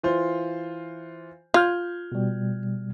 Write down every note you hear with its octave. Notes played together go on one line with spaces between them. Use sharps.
E3 F4 C5
F4 F6 G6 G#6
B2 G3